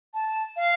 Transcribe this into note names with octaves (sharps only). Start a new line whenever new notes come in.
A5
F5